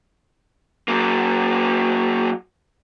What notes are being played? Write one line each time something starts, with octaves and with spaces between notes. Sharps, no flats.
F#3 A#3